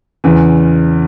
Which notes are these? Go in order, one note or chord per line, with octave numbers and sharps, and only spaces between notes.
E2 C#3 E3